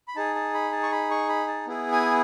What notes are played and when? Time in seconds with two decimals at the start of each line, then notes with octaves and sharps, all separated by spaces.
0.08 B5
0.16 D#4 G#4 A5
0.35 A5
0.54 B5
0.72 A5
0.83 C#6
0.92 B5
1.11 C#6
1.29 B5
1.48 A5
1.67 B3 E4 G#4
1.92 G#5